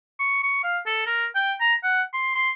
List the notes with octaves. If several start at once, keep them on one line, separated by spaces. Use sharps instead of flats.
C#6
C#6
F5
A4
A#4
G5
A#5
F#5
C6
C6